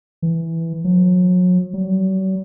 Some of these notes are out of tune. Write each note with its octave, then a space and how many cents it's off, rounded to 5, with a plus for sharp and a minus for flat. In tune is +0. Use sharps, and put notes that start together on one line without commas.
E3 +0
F#3 -35
F#3 +45